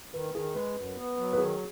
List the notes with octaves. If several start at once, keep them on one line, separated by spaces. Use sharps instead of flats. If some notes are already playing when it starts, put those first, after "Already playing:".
D#3 B4
D#3 G#4
G#3 B4
F#2
B3
F#3
B4
D#3 G#4